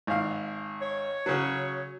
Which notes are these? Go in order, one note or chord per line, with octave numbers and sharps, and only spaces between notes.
G#1 F5
C#5
C#3 F#3